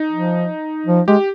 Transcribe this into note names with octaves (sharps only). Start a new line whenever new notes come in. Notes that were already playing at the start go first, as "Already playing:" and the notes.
Already playing: D#4
F3
F3
G#3 G4